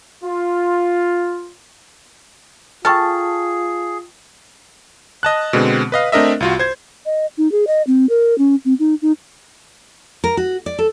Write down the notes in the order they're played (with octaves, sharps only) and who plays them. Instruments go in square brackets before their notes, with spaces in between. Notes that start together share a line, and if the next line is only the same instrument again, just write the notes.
[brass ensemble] F4
[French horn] F4 [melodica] G#4 [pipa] A4 A5 [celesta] G5 C#6 F6
[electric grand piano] D#5 A5 F#6
B2 D3 G#3 B3 C4
B4 D#5 F5
A3 C4 D4 A#4 D#5 E5
C2 F4 F#4
C5 G#6
[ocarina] D#5
D#4
G#4
D#5
C4
A#4
C#4
C4
D#4
D#4
[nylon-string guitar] A#4
F#4
D5
A4